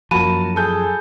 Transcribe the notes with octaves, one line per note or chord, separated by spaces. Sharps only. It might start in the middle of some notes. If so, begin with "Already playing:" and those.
F#2 F3 A#3 F#4 A5 B5 D#7
G#4 A4 G6